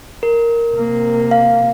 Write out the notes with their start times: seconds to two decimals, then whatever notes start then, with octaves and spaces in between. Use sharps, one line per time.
0.23 A#4
0.72 C3 A#3
1.31 F5